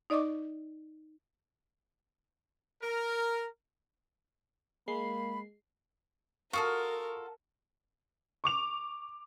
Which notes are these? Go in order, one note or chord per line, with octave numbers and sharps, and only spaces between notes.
D#4 D5 D#5 C#6 D6
A#4
G#3 A#3 B5 C7
F4 F#4 A4 A#4 C#6 D#6
C#6 D6 F7